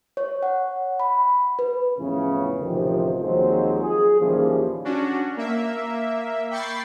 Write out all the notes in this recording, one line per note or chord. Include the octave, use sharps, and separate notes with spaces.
C#5
F#5
B5
B4
F2 A2 C#3 E3 B3 C#4
A1 D2 C3 D#3 F3
D#2 F3 F#3 G#3 C4 C5
G#4
D#2 A#2 E3 F3 G3 C#4
C#4 D4 F#4
A#3 E5
G5 B5 C#6 A6 C7